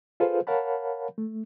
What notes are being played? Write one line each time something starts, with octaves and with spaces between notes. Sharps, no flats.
F4 G#4 A4 B4 C5 F5
A#4 C#5 F5 F#5 A5 B5
A3